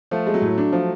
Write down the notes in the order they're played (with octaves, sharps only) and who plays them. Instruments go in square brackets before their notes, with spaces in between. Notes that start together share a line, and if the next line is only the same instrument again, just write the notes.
[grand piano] F3 [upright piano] A3
[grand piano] G#3
[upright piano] F#3
[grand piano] A2
D4
F3